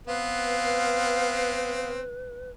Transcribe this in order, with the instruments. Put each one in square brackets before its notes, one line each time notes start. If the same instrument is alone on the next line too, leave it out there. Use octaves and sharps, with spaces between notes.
[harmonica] B3 C4 [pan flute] B4 [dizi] F5